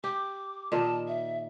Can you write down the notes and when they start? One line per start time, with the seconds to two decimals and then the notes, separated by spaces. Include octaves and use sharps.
0.04 G4 D6
0.72 A#2 D#3 D#5 A5
1.07 E5